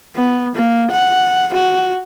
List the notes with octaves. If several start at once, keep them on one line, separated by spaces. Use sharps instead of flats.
B3
A#3
F#5
F#4